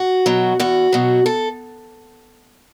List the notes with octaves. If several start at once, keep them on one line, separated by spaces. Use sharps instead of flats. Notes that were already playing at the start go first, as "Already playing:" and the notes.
Already playing: F#4
B2 F#3
E2 F#4
B2 F#3
A4